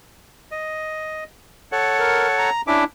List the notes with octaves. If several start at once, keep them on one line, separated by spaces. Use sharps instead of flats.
D#5
A4 C#5 F#5
A#4
A#5
C#4 D4 E4 E5 D6